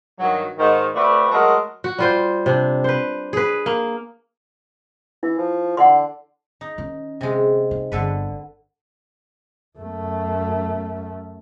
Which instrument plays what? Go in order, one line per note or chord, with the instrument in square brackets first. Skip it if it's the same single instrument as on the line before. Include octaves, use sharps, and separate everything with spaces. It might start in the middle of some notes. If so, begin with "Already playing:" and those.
[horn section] G2 D#3 F#3
G#2 D#3
A3 C4 F#4 B4 D5
F#3 G#3 A3 F#4 A#4
[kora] F#4
G3 F4 C5
C3 D4
B4 C5
G#4 B4
A#3
[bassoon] E3 [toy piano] E4
[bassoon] F3
[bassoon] D3 [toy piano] F#5 C6
[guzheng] D#4
[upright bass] D#3 C#4
[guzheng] C3 G#3
[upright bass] D#4
[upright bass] G1 [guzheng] D3 A4 B4
[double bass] F#2 A3